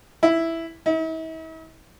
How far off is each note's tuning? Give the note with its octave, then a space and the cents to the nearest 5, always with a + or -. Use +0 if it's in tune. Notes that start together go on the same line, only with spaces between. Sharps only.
E4 +0
E4 -45